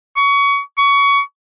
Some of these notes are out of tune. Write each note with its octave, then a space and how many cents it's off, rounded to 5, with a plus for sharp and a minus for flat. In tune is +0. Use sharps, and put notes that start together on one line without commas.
C#6 +25
C#6 +25